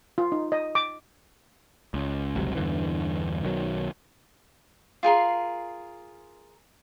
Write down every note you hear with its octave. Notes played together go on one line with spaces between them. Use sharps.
F4
D#4
D#5
D6
C#2
G1 C#2 C3 F#3
E2 G2 D3 E3
B1 D#3 F#3
F4 G#4 A#4 C6